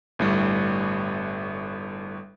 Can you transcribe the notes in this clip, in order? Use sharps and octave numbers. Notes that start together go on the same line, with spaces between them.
G1 A2 G3